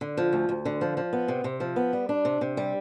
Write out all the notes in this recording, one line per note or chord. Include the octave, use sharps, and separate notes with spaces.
D3
F3
D2
D2
D3
F3
F3
B3
C3
C3
F3
B3
G3
D4
C3
C3
G3